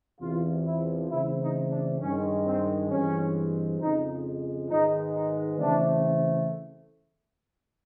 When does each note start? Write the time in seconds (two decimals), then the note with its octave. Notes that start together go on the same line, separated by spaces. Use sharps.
0.20 E2 C3 F3 F4
0.65 E4
1.10 C#3 E3 A3 C4 E4
1.40 D#4
1.70 D4
2.00 G2 D#3 G#3 C#4
2.45 C4
2.90 G2 E3 G#3 C4 C#4
3.80 F2 C#3 F3 G#3 D#4
4.69 G#2 D#3 G#3 B3 D#4
5.15 D#4
5.59 C#3 E3 A3 C4 D4